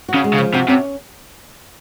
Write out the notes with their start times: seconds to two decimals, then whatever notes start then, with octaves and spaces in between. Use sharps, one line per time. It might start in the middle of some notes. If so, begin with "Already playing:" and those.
0.09 F#4
0.14 C#3
0.24 G#3
0.33 C#3
0.38 F3
0.54 C3 F#4
0.68 C3 C#4